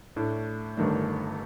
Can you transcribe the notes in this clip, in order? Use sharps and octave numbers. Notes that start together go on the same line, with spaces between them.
A2 A3 D4
G1 G2 D#3 A3 D4